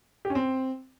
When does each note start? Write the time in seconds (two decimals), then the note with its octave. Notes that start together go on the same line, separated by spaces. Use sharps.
0.25 G4
0.30 C#4
0.35 C4